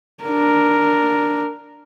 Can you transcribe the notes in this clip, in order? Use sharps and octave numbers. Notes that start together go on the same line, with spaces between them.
D4 A#4